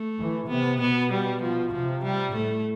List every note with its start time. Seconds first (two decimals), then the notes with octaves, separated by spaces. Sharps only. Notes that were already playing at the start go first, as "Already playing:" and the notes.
Already playing: A3
0.19 E3
0.49 C3 B3
0.81 B2 B3
1.12 G3
1.42 F3
1.73 C3 F3
2.03 G3
2.34 A2 A3